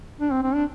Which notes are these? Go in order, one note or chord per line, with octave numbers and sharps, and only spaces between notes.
D4
C4
C4
D4